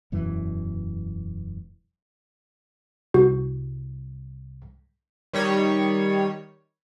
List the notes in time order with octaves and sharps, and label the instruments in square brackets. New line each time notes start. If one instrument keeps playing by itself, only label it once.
[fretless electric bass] E1 F#2 E3
[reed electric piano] C2 [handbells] F#4
[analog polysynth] D#3 G3 C#5